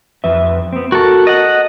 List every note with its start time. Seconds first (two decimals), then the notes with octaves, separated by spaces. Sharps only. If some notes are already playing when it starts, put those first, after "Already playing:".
0.24 F2 B4 E5
0.73 B3 C4
0.92 F#4 A4 A#4
1.27 D#5 F#5